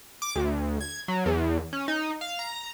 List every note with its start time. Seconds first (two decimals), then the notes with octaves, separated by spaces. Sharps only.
0.22 D6
0.35 D2
0.81 G#6
1.08 F#3
1.26 E2
1.73 C#4
1.88 D#4
2.21 F5
2.39 A#5